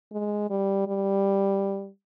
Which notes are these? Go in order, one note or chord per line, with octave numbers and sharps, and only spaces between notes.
G#3
G3
G3